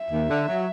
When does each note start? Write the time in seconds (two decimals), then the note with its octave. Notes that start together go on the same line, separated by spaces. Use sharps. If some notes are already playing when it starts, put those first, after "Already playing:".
Already playing: E5
0.10 D#2
0.29 D3
0.47 F#3